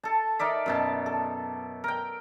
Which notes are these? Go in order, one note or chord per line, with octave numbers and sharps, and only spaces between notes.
A4 A5
D#4 A#4 D5 E5
F#2 B2 A5
A4
A#4 G5